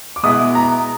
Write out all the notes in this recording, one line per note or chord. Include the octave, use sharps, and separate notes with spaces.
D6
B2 G#3 B3 E4 D#6
A#5